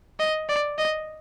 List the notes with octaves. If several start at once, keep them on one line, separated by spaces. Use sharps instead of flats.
D#5
D5
D#5